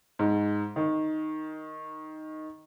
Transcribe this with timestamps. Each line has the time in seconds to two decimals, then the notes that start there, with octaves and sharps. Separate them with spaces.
0.19 G#2
0.76 D#3